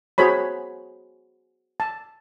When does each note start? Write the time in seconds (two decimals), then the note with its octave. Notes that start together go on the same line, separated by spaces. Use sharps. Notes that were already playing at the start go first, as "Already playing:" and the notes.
0.18 F#4 G#4 C5 C#5 B5
1.80 A5